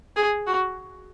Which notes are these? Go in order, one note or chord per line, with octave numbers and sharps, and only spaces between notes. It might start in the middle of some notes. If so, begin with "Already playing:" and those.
G#4
F#4